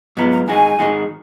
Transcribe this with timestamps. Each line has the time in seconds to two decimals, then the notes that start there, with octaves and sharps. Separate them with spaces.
0.17 G#2 F#3 B3 F4 A#5
0.32 A#5
0.48 G#2 D#3 G#3 D#4 F#4 G#5
0.79 G#2 D#3 G#3 D#4 F#4